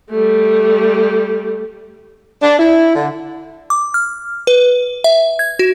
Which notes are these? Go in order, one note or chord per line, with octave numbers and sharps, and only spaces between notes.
G3 A3
D4
E4
D3
D6
F6
B4
E5
G#6
F#4